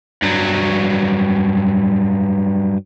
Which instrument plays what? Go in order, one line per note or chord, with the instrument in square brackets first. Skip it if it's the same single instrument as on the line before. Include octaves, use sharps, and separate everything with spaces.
[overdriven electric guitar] G2 F#3